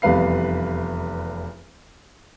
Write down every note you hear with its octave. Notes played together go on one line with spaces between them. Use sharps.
F1 E2 G3 B4 F5 C7